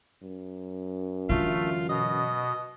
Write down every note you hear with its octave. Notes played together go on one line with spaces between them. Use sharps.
F#2
D3 E3 A3 F4
B2 D#5